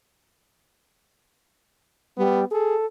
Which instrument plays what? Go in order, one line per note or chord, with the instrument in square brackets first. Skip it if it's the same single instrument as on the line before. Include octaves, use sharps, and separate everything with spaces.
[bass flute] G3 [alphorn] B3
[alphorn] G#4 [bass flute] A4